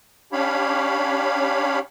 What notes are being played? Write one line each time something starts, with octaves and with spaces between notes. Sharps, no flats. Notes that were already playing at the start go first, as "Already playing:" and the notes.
C#4 D4 G4 C#5 F5 B5